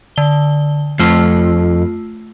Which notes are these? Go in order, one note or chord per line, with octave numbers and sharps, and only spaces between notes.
D3 G7
F2 A3 F4